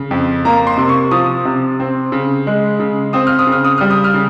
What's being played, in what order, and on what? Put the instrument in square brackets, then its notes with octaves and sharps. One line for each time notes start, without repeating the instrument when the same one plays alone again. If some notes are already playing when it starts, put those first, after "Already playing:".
Already playing: [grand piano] C#3
F2
A#3 A#5
C6
C3
C#6
F3 D#6
C3
C4
C#3
G#3
C#3
C4 D#6
F6
D#6
C#3
F6
D#6
G3 F6
D#6
F6
C#3